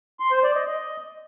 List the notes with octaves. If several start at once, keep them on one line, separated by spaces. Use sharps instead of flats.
C6
C5
D5
D#5
D#5